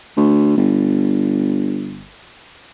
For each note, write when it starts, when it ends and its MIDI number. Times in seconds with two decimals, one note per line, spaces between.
0.17 0.54 38
0.57 2.09 31